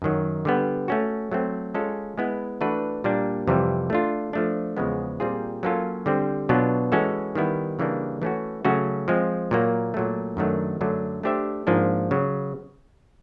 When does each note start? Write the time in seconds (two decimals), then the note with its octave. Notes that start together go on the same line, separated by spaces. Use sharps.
0.02 F#2 D#3 F#3
0.45 D3 G3 B3
0.88 A3 C#4 F#4
1.32 F#3 A3 C4
1.75 G#3 C#4 F4 A4
2.18 G#3 B3 E4
2.61 E3 A3 D4 F#4 B4
3.04 A#2 G3 A#3 D4
3.47 F2 C3 E3 G3
3.90 A3 D4 F4
4.33 F3 A3 D4
4.77 E2 C#3 F3 G#3 B3
5.20 A#2 G3 C4 F4 G#4
5.63 F#3 A#3 C#4 F4 A4
6.06 D3 G3 C4
6.49 B2 F#3 B3 D4 F4
6.92 E3 G#3 C#4 F#4 A4
7.35 D#3 G3 B3 E4
7.79 C#3 E3 G3 A#3 D4
8.22 E3 A3 C#4 F#4
8.65 C#3 F#3 A3 C#4 F#4
9.08 F3 G#3 C4
9.51 A#2 F#3 A#3
9.94 A#2 F#3 A3
10.37 F#2 D#3 F#3 A3 D4
10.81 F#2 D3 F#3 A3 D4
11.23 A3 D4 G4 C5 E5
11.67 G#2 F3 A#3 D4
12.11 C#3 F#3